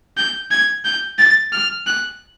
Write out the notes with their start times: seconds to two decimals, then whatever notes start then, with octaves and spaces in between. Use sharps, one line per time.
0.17 G6
0.51 G#6
0.85 G6
1.19 A6
1.53 F6
1.87 F#6